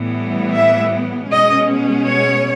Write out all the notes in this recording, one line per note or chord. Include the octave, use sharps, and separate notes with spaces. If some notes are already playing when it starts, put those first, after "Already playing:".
Already playing: A2 E3 G3 B3
E5
B2 G#3 C#4 D#5
C#5